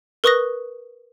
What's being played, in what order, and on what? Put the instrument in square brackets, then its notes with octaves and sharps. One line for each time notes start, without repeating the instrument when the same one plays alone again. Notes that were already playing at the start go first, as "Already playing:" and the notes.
[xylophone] A#4 B4 C#6 D#6 F#6 A#6